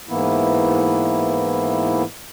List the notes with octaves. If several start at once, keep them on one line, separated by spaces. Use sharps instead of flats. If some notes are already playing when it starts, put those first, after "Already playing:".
G#2 E3 A#3 B3 E4